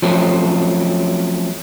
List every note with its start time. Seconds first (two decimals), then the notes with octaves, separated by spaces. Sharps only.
0.02 F3 F#3 A3 C4 C#4